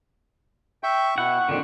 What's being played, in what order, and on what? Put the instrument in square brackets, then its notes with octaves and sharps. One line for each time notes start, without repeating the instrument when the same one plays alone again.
[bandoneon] E5 C#6 [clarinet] G5
[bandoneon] B2 E4 [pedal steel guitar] F#5 [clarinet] C#6
[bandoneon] F2 A#2 D#3 [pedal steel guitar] D3 D4